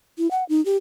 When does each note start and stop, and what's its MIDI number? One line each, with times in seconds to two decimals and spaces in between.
0.18 0.30 64
0.31 0.44 78
0.49 0.63 63
0.66 0.77 67